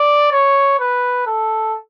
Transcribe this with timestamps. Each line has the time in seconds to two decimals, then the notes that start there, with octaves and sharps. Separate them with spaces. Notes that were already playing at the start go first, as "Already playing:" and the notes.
Already playing: D5
0.32 C#5
0.79 B4
1.27 A4